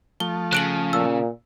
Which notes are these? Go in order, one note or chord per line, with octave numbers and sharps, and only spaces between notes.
F3 A3 G7
C#3 F#6 D7 F#7
A#2 E6